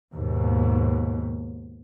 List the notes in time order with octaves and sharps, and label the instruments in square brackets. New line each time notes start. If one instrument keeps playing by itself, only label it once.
[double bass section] D#2 G#2 B2